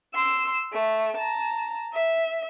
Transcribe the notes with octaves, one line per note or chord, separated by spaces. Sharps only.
C6 E6
A3
A5 A#5
E5